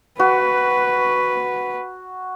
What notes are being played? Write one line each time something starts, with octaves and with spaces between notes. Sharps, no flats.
F#4 B4